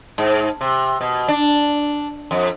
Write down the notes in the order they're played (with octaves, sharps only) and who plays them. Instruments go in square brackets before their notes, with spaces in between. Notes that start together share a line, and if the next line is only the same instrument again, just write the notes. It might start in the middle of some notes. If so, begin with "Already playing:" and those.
[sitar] G#2
C3
B2
D4
F2